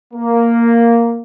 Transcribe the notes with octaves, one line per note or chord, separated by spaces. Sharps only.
A#3